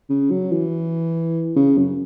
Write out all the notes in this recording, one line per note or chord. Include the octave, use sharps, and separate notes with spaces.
C#3
F#3
E3
C#3
F#2